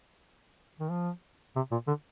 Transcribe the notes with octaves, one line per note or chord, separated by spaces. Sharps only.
D#3
F3
C3
A#2
D3